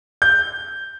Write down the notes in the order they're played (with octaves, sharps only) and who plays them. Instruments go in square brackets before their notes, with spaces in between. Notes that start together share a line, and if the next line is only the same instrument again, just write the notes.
[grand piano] G6